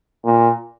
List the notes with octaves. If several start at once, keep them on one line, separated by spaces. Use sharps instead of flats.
A#2